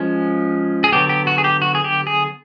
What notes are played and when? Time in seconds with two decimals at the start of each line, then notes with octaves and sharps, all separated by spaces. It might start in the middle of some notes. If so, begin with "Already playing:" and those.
Already playing: F3 G#3 C#4
0.84 G#4
0.92 D3 F#3 B3 G4
1.09 G4
1.27 F#4
1.38 G#4
1.44 G4
1.62 F#4
1.75 G#4
1.84 G4
2.07 G#4